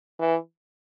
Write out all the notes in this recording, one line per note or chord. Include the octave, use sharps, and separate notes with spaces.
E3